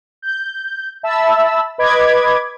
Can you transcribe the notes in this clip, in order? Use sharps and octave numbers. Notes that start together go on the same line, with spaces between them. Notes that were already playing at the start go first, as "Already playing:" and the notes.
G6
E5 A5 B5 E6
B4 D#5 B5 D6 G#6